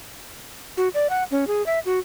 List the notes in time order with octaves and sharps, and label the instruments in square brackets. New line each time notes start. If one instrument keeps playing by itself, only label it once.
[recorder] F#4
D5
F#5
C#4
G#4
E5
F#4